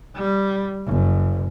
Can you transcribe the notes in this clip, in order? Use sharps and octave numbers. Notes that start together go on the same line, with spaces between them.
G3
F#1